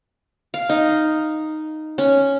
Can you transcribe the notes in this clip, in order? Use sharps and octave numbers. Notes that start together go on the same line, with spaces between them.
F5
D#4
C#4